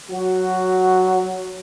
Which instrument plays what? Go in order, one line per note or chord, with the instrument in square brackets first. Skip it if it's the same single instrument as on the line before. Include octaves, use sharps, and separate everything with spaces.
[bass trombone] F#3 [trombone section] F#4